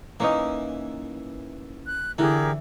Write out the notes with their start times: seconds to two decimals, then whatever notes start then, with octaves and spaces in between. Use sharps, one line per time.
0.20 E3 A#3 C#4 D#4
1.88 F#6
2.18 D3 E3 G4 G#4 A#4